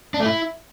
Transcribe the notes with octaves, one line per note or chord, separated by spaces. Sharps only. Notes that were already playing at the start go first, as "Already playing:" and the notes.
D4
A3
E4